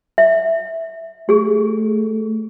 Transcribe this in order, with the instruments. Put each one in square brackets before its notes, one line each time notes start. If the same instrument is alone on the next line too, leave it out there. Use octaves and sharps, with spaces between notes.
[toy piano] E5
[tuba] A3 [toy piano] G4 G#4